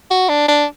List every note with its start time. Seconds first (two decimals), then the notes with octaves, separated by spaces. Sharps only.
0.11 F#4
0.29 D4
0.48 D4